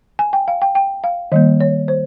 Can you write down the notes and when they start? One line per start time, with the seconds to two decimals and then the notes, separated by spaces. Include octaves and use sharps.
0.19 G#5
0.33 G5
0.48 F5
0.62 G5
0.75 G5
1.04 F5
1.32 D#3 G3 A#3 D#5
1.60 C#5
1.88 C5